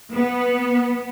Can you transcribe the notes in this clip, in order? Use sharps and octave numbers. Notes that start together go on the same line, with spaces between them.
B3